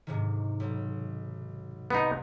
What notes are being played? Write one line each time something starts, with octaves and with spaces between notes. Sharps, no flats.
G#2 C3 D#3
B1
C2 B3 D#4